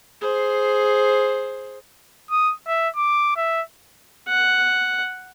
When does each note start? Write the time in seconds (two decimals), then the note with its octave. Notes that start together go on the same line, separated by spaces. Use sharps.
0.21 G#4 C5
2.30 D#6
2.67 E5
2.96 D6
3.36 E5
4.29 F#5